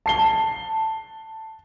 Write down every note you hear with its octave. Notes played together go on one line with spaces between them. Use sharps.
A5 C7 G7